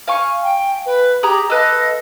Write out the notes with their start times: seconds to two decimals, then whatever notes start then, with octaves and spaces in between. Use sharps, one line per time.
0.08 F5 G#5 C#6
0.43 G5
0.85 B4
1.23 G4 G#4 A#5
1.50 A4 B4 D#5 F5